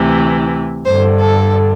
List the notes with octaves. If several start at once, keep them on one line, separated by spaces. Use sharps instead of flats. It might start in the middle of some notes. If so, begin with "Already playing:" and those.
Already playing: D2 C3 E3
G2 C5
D3
A4